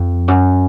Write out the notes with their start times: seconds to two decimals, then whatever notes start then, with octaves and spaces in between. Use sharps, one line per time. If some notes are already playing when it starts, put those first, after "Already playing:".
Already playing: F2
0.28 F#2